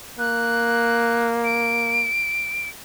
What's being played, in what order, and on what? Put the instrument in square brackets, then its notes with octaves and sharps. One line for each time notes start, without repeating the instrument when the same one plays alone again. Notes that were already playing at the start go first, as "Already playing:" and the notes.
[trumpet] A#3 [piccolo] F#6
[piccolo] D7